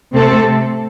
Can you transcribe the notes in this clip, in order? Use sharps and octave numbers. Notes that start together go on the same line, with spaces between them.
C3 A3 C4 A4